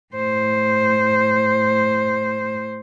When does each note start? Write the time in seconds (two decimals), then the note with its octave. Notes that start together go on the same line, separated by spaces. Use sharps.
0.14 A2 C5